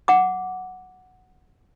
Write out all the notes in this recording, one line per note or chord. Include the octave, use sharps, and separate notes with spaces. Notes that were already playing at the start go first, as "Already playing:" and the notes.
F#5 D6